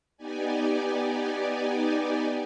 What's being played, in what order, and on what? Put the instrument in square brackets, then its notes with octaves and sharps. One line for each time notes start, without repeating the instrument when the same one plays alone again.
[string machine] B3 D#4 G4 D5 G#5